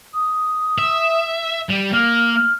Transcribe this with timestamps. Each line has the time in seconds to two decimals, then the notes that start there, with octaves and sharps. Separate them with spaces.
0.14 D#6
0.78 E5
1.70 G3
1.94 A#3 F6
2.36 F6